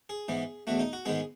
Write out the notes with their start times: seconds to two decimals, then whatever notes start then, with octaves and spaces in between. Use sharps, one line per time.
0.09 G#4
0.28 G#2 E3 B3
0.67 E2 B2 A3 F#4
0.80 D#4
0.93 F#4
1.05 G#2 D#3 G#3 B3 G#4